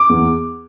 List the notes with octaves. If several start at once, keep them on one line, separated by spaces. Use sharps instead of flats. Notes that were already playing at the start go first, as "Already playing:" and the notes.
Already playing: D6
E2